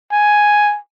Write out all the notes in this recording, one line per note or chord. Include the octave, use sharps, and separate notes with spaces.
G#5